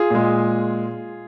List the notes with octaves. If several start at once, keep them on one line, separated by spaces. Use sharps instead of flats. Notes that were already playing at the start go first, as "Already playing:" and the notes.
Already playing: F4 G#4
A#2 G#3